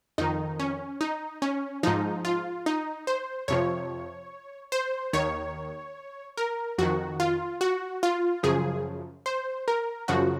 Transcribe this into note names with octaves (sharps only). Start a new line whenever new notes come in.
F2 D#3 D#4
C#4
D#4
C#4
G#2 F3 D#4
F4
D#4
C5
F2 C3 F3 C#5
C5
D#2 D#3 C#5
A#4
F2 D#3 F#4
F4
F#4
F4
F#2 C#3 F3 G#4
C5
A#4
F#2 C#3 F3 F#4